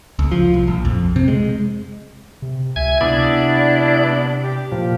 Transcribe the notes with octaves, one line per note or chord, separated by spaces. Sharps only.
C#2
F3
C2
A#1
F2
C3
G#3
C3
C#2 E5 G#5 G#6
C3 B3 D4 E4 D5
G4
A#2 F3